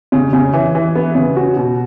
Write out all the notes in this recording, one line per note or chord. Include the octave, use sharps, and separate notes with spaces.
C#3
C#3
E3
E3
B3
C#3
F#4
B2